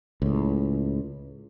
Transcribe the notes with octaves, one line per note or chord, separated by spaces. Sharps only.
C#2 A2